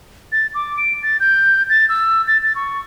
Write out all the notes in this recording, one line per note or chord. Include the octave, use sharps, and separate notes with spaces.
A6
D6
D7
A6
G6
A6
E6
A6
A6
C#6